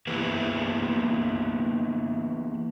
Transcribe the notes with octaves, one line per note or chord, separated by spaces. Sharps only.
E3 A#3 B3 E4 G4 B4